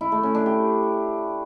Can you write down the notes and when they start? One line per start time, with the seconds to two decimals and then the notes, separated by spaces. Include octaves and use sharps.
0.01 E4
0.12 A3
0.23 C#4
0.35 D4
0.46 G4